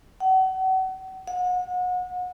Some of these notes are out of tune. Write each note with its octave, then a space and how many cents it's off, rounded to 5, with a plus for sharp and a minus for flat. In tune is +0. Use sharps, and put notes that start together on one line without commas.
F#5 +35
F#5 -35